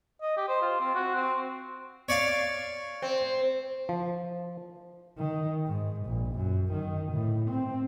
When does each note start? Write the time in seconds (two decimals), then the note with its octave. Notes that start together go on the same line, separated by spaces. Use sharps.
0.22 D#5
0.37 G4
0.48 C5
0.62 F4
0.81 C4
0.95 F#4
1.15 C4
2.09 C#5 D5 F5
3.02 C4
3.89 F3
5.18 D#3
5.67 G#2
6.06 A#1
6.36 F#2
6.73 D#3
7.12 A2
7.50 C4